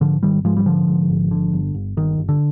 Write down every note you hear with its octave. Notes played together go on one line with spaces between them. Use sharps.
G#2 D3 F3
G#1 D#3 G3
G#2 F3 G#3
G3
G#1 D3 F3
G#2
G#1
D3
G1
G1
G1 D#3
G1
D3